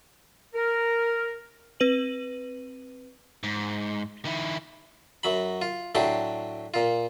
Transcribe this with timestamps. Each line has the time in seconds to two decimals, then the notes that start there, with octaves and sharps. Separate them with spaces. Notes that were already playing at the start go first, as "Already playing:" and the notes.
0.54 A#4
1.80 C4 B4 D#7 F#7
3.43 G#2
4.25 D#3 E4
5.23 F#2 F#3 B5
5.62 F4
5.95 A2 F#3 D4 G4 C6 D6
6.74 A#2 F4